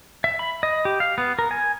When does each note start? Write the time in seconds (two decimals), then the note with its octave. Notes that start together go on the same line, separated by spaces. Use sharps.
0.24 E5
0.39 B5
0.63 D#5
0.85 G4
1.00 F5
1.18 B3
1.39 A#4
1.51 G#5